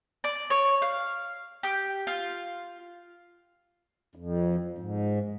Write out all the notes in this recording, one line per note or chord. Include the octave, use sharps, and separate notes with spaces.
D5
C#5
F5
G4
F4
F2
G#2